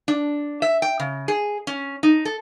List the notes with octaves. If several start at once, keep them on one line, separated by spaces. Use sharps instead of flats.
D4
E5
G5
C#3
G#4
C#4
D#4
A4